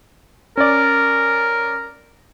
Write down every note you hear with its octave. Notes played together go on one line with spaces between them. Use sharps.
C#4 A#4 D5